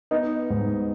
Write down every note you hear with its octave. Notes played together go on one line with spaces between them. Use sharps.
B3 D#4
G#2